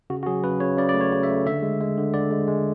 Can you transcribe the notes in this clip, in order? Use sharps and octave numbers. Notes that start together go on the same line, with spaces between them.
C#3 F#4
F#4
F#3 G#4
C#3 B4
C#3 C#5
C#3 D5
D5
A3
C#5
C#3
E5
A3
D3 E5
G#3
G#3
D3
D3 D5
G#3
G#3